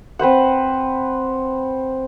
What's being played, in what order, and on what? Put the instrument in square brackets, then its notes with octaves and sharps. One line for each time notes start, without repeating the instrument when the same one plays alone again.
[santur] C4 B4 C5 F#5